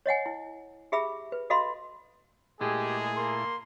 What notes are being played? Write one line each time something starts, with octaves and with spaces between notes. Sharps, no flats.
C#5 D#5 F#5 G#5
E4
G4 G#4 E5 B5 E6
B4
F#4 A4 D#5 F5 B5 C6
A#2 G#3 A3 E4 G4 G#4
A#3 C6